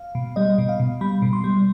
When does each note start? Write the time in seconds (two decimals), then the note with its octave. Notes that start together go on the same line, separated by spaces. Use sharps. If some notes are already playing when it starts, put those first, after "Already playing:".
Already playing: F5
0.15 B2
0.36 G3 D#5
0.58 B2
0.69 F5
0.80 B2
1.01 G3 B5
1.22 B2
1.33 C6
1.44 G3